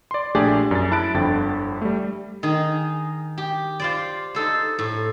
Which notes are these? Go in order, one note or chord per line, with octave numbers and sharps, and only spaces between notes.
D5 C6
A#1 A3 D4 G4 G#4 D5
F#2 A6
E4 A5 B5 F#6 A6 D7
G1 F2 D3 G5 A6
G3 A3
D#3 D#4 G#4
G4
F4 C5 D5
D#4 A4 C5
A2